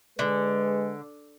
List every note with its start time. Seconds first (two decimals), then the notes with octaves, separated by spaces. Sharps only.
0.19 D3 G#3 G#4 B4